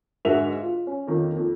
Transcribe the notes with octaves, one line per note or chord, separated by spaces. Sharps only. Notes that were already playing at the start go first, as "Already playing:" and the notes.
G#2 D3 F#4 A#4 E5 F7
F4
C#4
F2 D#3 A#3
F2